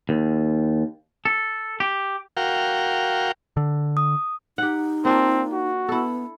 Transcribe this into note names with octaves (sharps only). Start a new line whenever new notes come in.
D#2
A4
G4
F#4 A#4 F5 G5
D3
D#6
D#4 G4 F#5
A#3 C4 D4 F4
F#4
B3 E4 A4